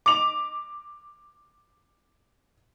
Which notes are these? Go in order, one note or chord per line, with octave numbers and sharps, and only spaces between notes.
D6 F7